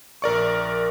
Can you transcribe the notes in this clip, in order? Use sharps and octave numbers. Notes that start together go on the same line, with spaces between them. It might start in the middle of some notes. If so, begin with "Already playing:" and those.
A#1 A#4 D5 C#6